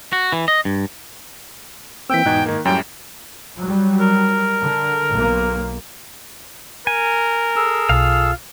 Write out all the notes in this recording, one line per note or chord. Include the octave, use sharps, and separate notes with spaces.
F#4
E3
D#5
G2
E3 A#3 C4 G5 E6 B6
E2 G#2 B2 D#4 F#6 G#6
D#3 A#3
F#2 A2 F#3 G3 G5
F#3 G3
A#4
D3
B1 A#3
A#4 G#5
G#4 A4 E6
B1 F4 F5